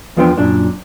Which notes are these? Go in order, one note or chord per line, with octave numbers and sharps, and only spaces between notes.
E2 F3 B3 D4 G5 C6
F#2 A#2 D4